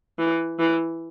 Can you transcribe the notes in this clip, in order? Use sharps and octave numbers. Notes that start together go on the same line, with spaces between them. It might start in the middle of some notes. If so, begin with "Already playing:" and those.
E3
E3